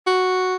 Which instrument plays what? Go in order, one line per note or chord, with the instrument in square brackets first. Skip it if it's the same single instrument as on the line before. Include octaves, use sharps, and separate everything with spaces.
[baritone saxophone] F#4